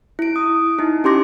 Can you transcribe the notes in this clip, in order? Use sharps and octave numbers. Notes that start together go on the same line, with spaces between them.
E4 D7
D#6
D#4 E4
C#4 G4 C6 D6 A#6